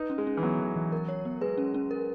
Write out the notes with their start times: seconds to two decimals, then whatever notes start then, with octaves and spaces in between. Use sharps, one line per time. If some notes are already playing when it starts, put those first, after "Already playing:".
Already playing: D#4 B4
0.10 C#4
0.18 G#3
0.27 C#4
0.37 E3
0.43 F#3 B3
0.59 E3
0.76 E3
0.92 A#4
1.09 C#5
1.25 B3
1.41 G#3 B4
1.58 C#4
1.74 C#4
1.91 A#4